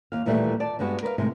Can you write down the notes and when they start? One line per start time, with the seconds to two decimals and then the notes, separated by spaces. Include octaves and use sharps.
0.12 D#2 F5
0.26 D#2 A#2 E3 G3 A3 D4
0.60 D5 A5
0.79 G2 G3 G#3 B3 F#4
1.03 A#4 B4 D5 F5
1.18 A2 C3 D#3 G#3